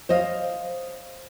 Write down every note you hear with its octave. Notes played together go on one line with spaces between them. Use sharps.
C5 C#5 D#5 F5